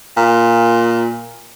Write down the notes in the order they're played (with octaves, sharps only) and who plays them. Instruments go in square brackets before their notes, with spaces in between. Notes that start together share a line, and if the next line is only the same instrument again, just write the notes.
[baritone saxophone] A#2